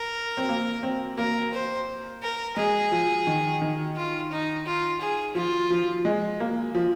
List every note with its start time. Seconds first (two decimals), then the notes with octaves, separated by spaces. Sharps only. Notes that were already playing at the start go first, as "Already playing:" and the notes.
Already playing: A#4
0.37 C4
0.49 A#3
0.83 C4
1.18 A#3 A#4
1.53 C5
2.22 A#4
2.56 G#3 G#4
2.92 F3
3.27 D#3
3.62 D#3
3.96 F4
4.32 D#4
4.66 F4
5.01 G#4
5.35 F3 F4
5.70 F3
6.05 G#3
6.40 A#3
6.75 F3